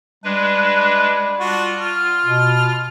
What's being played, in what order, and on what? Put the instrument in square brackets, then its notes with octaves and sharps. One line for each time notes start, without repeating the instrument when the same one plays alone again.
[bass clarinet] G3 [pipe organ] G#3 D4 B4
[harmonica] D4 F#4 [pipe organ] F4
[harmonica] F6
[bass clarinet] B2